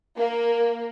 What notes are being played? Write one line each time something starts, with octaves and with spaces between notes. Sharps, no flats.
A#3